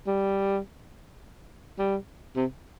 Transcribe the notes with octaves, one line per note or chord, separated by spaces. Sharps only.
G3
G3
C3